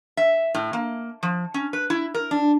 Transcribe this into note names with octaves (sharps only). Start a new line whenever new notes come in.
E5
A2
A#3
F3
C#4
B4
E4
A#4
D4